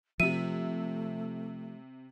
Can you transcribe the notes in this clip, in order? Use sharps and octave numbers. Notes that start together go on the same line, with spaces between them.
C3 F3 A3 E5 D#7